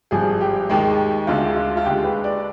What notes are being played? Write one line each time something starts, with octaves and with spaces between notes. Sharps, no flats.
G#1 G2 F3 G#4
G4
D#2 D#3 G#3
D2 D3 G#3 F4
F4
F4
D#2 D3 G#3 G4
B4
D5